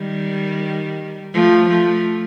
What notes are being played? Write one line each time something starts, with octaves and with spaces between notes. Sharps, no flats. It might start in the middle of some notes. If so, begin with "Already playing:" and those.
Already playing: D#3 G3
F3 A3
F3 A3